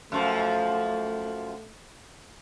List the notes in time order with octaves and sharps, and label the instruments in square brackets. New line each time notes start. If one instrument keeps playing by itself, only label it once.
[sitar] F#2 F3 [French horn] A3